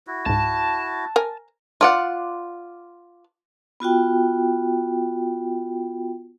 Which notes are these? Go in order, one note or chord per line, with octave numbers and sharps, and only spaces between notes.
E4 F#4
C#2 G#2 A5
A#4 G#5
F4 D5 F#5
B3 F4 F#4 G5